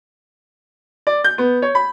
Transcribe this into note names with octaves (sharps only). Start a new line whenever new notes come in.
D5
G6
B3
C#5
B5